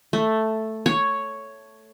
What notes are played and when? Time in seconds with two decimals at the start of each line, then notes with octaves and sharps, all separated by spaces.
0.13 A3
0.86 C#5